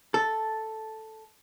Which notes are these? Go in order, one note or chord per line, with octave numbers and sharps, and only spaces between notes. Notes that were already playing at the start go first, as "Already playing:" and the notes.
A4